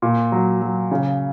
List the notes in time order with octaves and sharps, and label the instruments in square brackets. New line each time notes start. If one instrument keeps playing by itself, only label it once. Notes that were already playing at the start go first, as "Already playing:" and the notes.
[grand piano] A#2
F#3
F#3
C#3